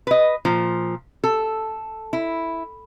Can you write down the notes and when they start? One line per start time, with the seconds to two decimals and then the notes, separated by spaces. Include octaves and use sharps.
0.07 B4 D#5
0.45 A#2 F3
1.24 A4
2.13 E4